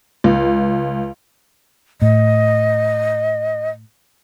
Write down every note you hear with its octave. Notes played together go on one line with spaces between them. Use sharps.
C#2
A2 D#5